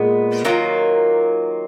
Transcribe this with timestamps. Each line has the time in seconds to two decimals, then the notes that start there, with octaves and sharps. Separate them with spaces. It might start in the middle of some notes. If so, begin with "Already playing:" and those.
Already playing: A#2 G#3 B3
0.45 D#3 F#3 A#3 F4